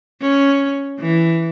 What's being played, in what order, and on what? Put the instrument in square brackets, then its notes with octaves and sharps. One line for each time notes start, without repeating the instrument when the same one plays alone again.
[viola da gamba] C#4
E3